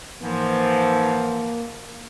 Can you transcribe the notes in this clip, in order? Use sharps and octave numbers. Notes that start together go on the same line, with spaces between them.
G#2 E3 F3 A#3